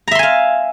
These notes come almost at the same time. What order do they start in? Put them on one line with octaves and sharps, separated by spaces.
A#5 E5 C6 G#5 F5